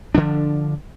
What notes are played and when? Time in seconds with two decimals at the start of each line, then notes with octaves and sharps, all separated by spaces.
0.15 D3 F3 D4